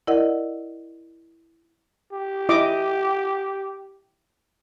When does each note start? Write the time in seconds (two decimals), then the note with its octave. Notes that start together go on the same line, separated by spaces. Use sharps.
0.07 E4 A#4 D5 D#5 F#5
2.13 G4
2.49 E4 D#5 D6